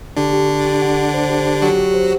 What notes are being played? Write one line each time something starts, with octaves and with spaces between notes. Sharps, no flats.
D3 D4 G4
G4
G4
G4
F#5
F#5
C5
G4
G4
F#3 F#4 G4
G4
C5